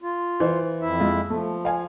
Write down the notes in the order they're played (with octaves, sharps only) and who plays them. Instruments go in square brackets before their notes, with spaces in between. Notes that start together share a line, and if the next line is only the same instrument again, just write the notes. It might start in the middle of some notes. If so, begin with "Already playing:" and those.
[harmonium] F4
[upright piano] E3 C5
[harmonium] F2 E4 E5
[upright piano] G#3 F4
[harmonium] F3 [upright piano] A3
[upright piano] F5 G#5